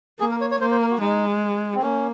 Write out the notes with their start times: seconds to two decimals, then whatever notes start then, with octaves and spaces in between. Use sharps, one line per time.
0.20 A#3 G#4
0.31 A#4
0.41 C#5
0.51 C#5
0.60 A#3 C5
0.71 C5
0.81 A#4
0.91 F#4
1.01 G#3 D#4
1.76 C4
1.83 A#3 C#4